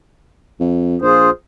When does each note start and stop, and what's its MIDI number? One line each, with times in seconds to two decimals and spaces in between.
0.60 0.97 41
1.02 1.29 34
1.02 1.30 65
1.02 1.30 68
1.02 1.30 72